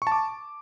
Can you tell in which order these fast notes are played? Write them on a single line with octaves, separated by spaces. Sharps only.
C#6 A5 D6